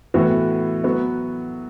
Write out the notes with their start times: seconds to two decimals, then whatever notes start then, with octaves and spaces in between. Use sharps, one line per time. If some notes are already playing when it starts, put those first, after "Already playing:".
0.14 A2 E3 B3 F#4
0.84 F#3 B3 F#4